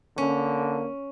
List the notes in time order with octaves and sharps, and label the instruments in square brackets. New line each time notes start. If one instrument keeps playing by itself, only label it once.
[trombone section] D3 A#3 [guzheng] C#4